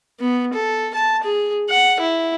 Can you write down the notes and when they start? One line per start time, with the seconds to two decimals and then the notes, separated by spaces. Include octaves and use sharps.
0.20 B3
0.53 A4
0.94 A5
1.24 G#4
1.69 F#5
2.00 E4